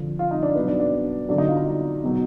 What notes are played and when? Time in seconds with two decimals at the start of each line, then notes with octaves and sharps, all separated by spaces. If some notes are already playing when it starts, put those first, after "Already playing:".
Already playing: D3 F3
0.19 F4
0.31 D#4
0.43 D4
0.55 B2 F#3 B3
0.68 D4
0.80 D4
1.29 D3 F#3 D4
1.38 D#4
1.48 F4
1.57 D#4
2.04 B2 F#3